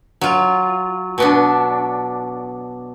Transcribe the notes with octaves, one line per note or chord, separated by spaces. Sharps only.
F#3 F4
B2 B3 D4